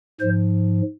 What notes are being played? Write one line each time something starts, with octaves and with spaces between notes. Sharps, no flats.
G#2 F3 C5